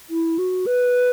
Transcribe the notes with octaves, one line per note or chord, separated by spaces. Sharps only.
E4
F#4
B4